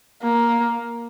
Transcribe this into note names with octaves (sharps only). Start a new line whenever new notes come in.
A#3